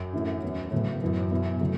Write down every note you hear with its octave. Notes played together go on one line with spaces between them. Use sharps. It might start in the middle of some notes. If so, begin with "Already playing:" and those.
Already playing: F#2
A2 E3 A3 C#4 E4
E2 E3 C#4 E4
A2 C#3 F#3 B3
F#2 A2 E3 B3
B2 B3 E4
C#3 F#3 A3